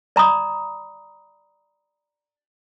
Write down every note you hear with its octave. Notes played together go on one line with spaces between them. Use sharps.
D5 A#5 B5 D#6